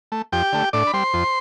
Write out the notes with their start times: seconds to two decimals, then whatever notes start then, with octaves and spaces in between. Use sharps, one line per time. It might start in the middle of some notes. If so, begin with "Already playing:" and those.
0.12 A3
0.32 F2 G4 G5
0.53 D3 A3
0.73 A2 D4 D5
0.87 B5
0.93 G3 C5 C6
1.14 F2